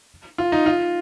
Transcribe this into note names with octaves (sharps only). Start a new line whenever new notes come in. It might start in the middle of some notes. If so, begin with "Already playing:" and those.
F4
D#4
F4